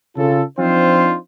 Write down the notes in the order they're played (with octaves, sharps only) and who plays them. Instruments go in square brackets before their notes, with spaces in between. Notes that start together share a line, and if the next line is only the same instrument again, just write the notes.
[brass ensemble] C#3 F4 A4
F3 C4 D4 D#4 F4 C5